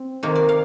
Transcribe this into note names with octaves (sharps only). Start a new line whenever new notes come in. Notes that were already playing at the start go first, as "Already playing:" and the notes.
Already playing: C4
C3 D#3 A#3
D5
F5